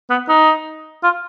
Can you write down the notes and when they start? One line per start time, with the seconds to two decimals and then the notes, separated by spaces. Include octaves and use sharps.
0.10 B3
0.29 D#4
1.04 F4